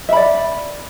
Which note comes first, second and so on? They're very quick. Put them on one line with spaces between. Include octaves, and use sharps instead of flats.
E5 B5 D5